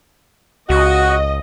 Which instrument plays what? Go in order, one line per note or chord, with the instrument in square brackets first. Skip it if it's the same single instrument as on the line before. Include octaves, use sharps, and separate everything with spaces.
[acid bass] C#2 [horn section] F#4 [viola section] D#5